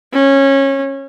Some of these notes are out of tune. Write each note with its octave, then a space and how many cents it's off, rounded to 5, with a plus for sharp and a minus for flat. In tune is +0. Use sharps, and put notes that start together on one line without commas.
C#4 -20